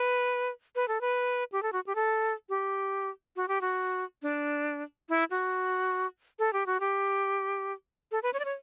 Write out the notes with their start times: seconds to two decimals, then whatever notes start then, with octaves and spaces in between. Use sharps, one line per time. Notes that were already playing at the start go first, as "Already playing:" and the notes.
Already playing: B4
0.75 B4
0.88 A4
1.01 B4
1.52 G4
1.63 A4
1.73 F#4
1.87 G4
1.95 A4
2.49 G4
3.36 F#4
3.48 G4
3.61 F#4
4.22 D4
5.09 E4
5.31 F#4
6.39 A4
6.53 G4
6.66 F#4
6.80 G4
8.12 A4
8.23 B4
8.33 C#5
8.39 D5
8.45 C#5